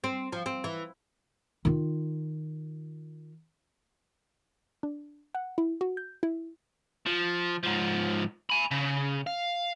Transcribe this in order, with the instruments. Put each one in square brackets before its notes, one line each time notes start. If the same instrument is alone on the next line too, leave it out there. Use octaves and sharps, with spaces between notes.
[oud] C4
F3
C4
E3
[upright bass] D#3 F4
[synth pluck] D4
F#5
E4
F#4
G6
E4
[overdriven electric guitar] F3
G#2 F3
G#5 B5
C#3
F5